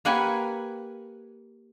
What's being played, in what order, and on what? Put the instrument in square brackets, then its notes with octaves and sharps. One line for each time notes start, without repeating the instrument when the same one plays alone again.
[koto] A#3 G4 B4 F#5 G#5